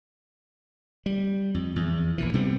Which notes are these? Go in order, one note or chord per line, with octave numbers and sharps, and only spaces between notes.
G3
F2
E2
A#1 A#2 E3
C3 G3 B3 C4